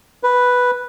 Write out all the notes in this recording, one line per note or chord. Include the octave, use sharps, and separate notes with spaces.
B4